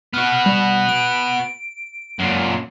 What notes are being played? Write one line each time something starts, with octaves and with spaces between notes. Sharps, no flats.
B3 F#4 F6
G3
D7
F#2 A#2